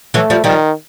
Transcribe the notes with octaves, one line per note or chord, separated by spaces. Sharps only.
E3 F#3 A3
F3 G3
D#3 F3 G3